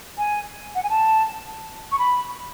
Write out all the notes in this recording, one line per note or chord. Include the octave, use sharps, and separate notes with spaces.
G#5
F#5
G#5
A5
C#6
B5